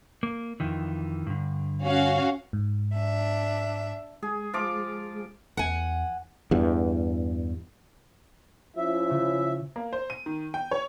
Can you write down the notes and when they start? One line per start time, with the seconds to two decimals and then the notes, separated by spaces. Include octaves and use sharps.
0.23 A#3
0.60 F2 D#3 E3
1.26 G2 D3
1.84 C#4 F#4 F5
2.53 G#2
2.96 D4 E5
4.23 G#3 G#4
4.53 F3 F4 D6
5.57 E2 F#5 G#5
6.51 E2 G2
8.76 F3 C#4 E4 E5
9.10 C#3
9.76 A#3
9.93 C5
10.10 D#7
10.26 D#3
10.54 G5
10.71 C#5